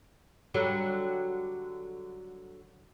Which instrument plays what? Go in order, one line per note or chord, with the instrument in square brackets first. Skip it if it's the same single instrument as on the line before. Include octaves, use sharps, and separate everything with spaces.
[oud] D3 F#3 G3